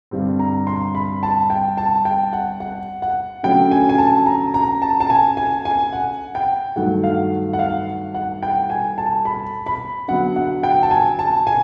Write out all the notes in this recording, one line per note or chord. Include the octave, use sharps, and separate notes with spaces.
G2 D3 G3 C4
A#5
C6
B5
A5
G5
A5
G5
F#5
F#5
F#5
D3 F#3 A3 C#4 G5
G#5
G#5
A5
A#5
A#5
A5
A5
G#5
G#5
G#5
F#5
G5
G2 D#3 F#3 A3 F#5
F5
F#5
F5
F#5
G5
G#5
A5
B5
B5
D3 F#3 B3 F#5
F#5
G5
A5
G#5
A5
G#5